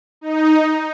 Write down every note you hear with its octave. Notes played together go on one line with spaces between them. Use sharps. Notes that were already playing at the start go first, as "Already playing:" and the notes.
D#4